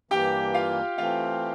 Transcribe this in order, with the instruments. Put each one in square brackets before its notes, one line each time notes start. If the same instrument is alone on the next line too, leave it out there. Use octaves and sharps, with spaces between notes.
[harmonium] G2 E3 A#3 [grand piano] G4 G5
[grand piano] F4 F5
[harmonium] E3 A3 C4 [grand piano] F4 F5